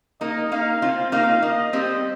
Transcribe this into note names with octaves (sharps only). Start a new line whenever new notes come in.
A#3 D#4 D#5
A#3 D#4 F5
C4 F4 F5
A#3 D#4 F5
A#3 D#5
G3 C4 D#5